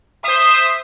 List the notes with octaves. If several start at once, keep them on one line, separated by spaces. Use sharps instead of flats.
C5 E5 D#6